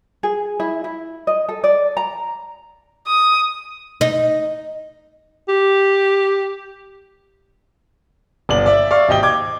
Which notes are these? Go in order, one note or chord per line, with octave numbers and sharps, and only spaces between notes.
G#4
E4
E4
D#5
A4
D5
A#5
D#6
D#4
G4
G1 D5 F#7
D5 E5
D5 E5 F5 C#6
G#1 G4 D#5 G5 G7
D6 G#6